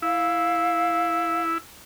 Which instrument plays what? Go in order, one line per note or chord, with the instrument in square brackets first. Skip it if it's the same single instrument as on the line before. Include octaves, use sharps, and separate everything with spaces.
[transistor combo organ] E4 [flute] F5